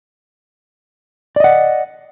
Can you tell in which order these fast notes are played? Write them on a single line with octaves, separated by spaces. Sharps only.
D5 D#5 F#5